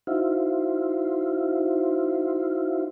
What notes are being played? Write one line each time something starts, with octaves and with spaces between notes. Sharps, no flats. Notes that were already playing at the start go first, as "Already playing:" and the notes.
D#4 E4 F#4 C5 E5 F5